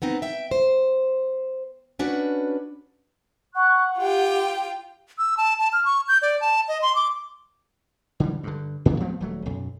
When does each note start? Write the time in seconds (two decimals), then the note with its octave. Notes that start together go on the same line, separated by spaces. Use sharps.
0.02 B3 C4 D#4
0.22 E5 G5
0.51 C5
1.99 C#4 D4 F#4 B4
3.55 F#5 C#6 F#6
3.98 F4 G4 G5
5.18 E6
5.37 A5
5.59 A5
5.73 F6
5.85 C#6
6.08 G6
6.22 D5
6.41 A5
6.68 D#5
6.82 C6
6.95 D6
8.20 D3 E3 G3
8.43 G2 D3
8.85 A2 C#3 F3 F#3
9.00 F3 A3 B3 C4
9.20 D#1 F#3 A3
9.46 B1 F#2